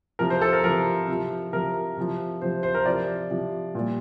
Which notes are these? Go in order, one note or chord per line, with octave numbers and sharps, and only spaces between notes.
C3 F3 A#4
C5
A4
A#4
C3 F3 A#4
C3 F3
C3 F3 A#4
C3 F3
C3 F3 C5
C5
A#4
C3 F3 D5
C3 F3
A#2 G3